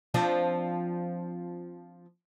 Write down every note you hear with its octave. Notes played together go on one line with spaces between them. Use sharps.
F3 C4 D4